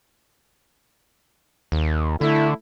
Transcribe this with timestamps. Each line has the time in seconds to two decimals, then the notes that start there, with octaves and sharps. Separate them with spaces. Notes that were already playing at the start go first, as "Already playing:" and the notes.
1.72 D#2
2.21 D3 A3 E4